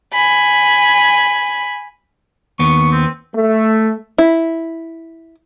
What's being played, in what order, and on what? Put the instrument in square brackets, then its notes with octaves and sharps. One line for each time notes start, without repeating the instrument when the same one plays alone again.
[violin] G#5 B5
[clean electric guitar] D#2 B3 [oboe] C#6
[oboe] C4
[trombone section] A3
[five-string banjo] E4